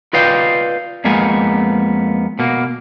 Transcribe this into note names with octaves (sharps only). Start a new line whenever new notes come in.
F4 B4 D5 D#5 F5 G5
F2 G#3 A#3 B3 G#5
B2 A#3